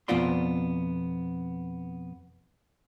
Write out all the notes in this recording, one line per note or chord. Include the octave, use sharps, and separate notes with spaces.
F2 B2 B3 F4 D5 C6